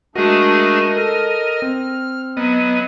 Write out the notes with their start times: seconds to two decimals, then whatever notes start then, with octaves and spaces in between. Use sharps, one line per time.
0.16 G#3 A3 D4 F#4 G#4 A#4 D#5
0.97 A4 F6
1.62 C4
2.37 F#3 B3 D#5